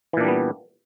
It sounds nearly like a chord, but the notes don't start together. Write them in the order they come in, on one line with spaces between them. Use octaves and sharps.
E3 A#2 D4 G3 B3